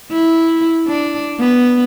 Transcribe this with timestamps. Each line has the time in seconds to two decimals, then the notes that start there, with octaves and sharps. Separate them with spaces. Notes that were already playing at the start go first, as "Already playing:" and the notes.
0.11 E4
0.87 D4
1.40 B3